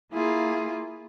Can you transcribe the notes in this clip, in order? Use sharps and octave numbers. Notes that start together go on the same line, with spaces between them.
A#3 E4 F4 G#4